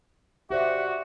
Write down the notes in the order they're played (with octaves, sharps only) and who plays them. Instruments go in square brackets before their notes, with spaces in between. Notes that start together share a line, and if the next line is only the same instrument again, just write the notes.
[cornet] F#4 [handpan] G4 C5 D5 [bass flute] E5